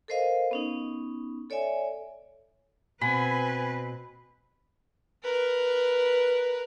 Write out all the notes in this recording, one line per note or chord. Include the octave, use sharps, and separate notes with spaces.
A4 A#4 C5 D#5 F5
B3 C#4 D#4
A4 C#5 D5 E5 G#5
B2 C4 B4 G#5 B5
A#4 B4